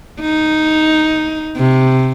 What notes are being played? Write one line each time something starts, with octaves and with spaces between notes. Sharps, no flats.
D#4
C3